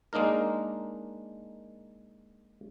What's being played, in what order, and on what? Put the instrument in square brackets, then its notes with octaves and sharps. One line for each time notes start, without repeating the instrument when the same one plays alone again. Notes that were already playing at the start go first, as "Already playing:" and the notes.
[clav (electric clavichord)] G#3 A#3 D4 D#4 A#4